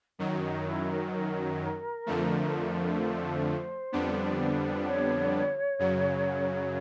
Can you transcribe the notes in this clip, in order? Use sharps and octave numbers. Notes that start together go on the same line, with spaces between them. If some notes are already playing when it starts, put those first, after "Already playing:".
F#2 D#3 F#3 D#4
D#4
E4
A#4
B4
A#4
F2 D3 F3 A3
C5
F2 D3 G3 B3 D4
C#5
F#2 C#3 F#3